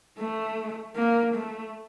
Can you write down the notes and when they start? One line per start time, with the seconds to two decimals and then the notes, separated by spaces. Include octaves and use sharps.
0.18 A3
0.96 A#3
1.35 A3